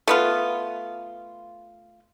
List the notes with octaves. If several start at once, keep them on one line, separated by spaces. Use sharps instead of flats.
A3 B3 F4